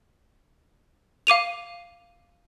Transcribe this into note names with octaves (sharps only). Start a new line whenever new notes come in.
F5 D6 D#7 F7